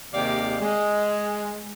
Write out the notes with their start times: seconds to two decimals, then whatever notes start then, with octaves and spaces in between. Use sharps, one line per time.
0.13 D#2 C3 G#3 G4 D5 F5
0.61 G#3